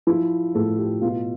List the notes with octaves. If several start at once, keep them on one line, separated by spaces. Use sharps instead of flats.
F3 E4
A2 A4
G4
B2 F4